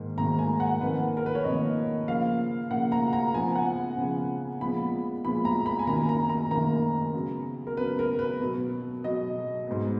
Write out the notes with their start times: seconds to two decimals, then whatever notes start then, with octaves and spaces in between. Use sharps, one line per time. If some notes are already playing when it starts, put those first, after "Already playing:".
Already playing: G#2 D#3 A#3
0.18 G#2 D#3 A#3 A#5
0.39 G#5
0.60 F#5
0.81 F2 D#3 A#3 B4
1.17 A#4
1.26 B4
1.35 C#5
1.44 F2 D#3 A#3 D#5
2.07 C#3 F3 A#3 F5
2.71 C#3 F3 A#3 F#5
2.92 A#5
3.13 A#5
3.34 C#3 F3 B3 G#5
3.56 F#5
3.98 C#3 F3 B3
4.60 A#2 F3 G#3 B3 B5
5.24 A#2 F3 G#3 B3 B5
5.45 A#5
5.66 B5
5.79 G#5
5.87 F#2 D#3 A#3 A#5
6.09 A#5
6.29 A#5
6.50 F#2 D#3 A#3 A#5
7.13 C#3 F#3 B3
7.67 A#4
7.77 C#3 F#3 B3 B4
7.99 A#4
8.19 B4
8.40 B2 F#3 B3
9.03 B2 F#3 B3 D#5
9.67 G#2 F#3 B3